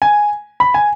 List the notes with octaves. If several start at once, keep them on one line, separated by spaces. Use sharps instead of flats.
G#5
B5
G#5